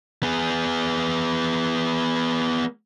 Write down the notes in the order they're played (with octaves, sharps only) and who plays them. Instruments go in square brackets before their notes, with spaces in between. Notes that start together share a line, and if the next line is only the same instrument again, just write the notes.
[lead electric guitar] B3 G#4